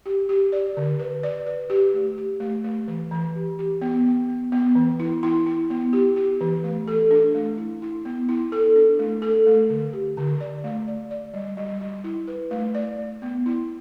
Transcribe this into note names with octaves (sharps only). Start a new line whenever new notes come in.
G4
G4
D5
D3
B4
D5
B4
G4
A3
G4
A3
A3
E3
E3
G4
G4
B3
B3
B3
B3
E3
E4
E4
E4
B3
G4
G4
E3
A3
A4
D4
A3
E4
E4
B3
E4
A4
D4
A3
A4
A3
D3
G4
D3
D5
A3
D5
D5
G3
G3
G3
E4
B4
A3
D5
A3
B3
E4